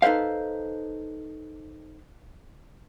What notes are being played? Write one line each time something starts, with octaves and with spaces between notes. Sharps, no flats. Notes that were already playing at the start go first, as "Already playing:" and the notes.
D#4 A4 B4 C5 F5